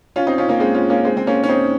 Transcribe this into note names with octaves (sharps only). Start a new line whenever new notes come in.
C#4 F4
C4 D#4
C#4 F4
A#3 C#4
G#3 C4
C#4 F4
A#3 C#4
G#3 C4
C4
A#3 C#4
C#4
C4 D#4